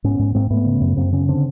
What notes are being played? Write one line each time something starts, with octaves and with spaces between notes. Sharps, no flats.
G#2 B3 C#4
G#2
G#2 A#3 C4
G#2 A3 B3
C#3
F#2
F#2 A#3 C4
C#3 B3 C#4
D3 C4 D4